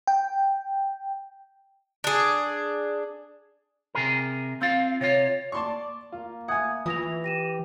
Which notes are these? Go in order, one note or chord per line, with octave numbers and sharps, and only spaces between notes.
G5
D4 G#4
C3 G#4 A#4
C4 F4 F5
C3 F4 C#5
D5 A5 C6 C#6
A#3 F4
E5 F#5 G#5 D#6 G#6
E3 F4 D#6 A#6 F7
G4 A#6 D#7 E7